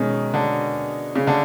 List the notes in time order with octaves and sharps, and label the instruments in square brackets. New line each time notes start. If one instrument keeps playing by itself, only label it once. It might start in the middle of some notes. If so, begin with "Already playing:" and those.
Already playing: [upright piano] B2 G#3 C#4 [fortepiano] D#3
[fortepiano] D3
C#3
D3